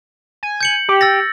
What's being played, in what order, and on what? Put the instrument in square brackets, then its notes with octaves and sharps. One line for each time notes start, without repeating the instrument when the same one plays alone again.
[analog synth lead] G#5
[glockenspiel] G6 C#7 F#7
[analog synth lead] G4
[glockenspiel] E6 A6 A#6